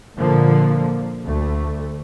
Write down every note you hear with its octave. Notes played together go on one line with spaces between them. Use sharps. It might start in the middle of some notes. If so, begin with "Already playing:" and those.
A#2 D3 F3 A#3
D2 A3